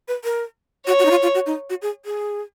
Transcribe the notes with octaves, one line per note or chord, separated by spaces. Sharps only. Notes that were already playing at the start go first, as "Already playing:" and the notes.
B4
A#4
F#4 C#5
F#4
D#4
F4
F4
F#4
D#4
F#4
G#4
G#4